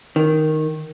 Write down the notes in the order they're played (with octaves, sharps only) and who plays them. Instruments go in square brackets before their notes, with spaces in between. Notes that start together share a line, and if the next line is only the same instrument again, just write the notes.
[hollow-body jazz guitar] D#3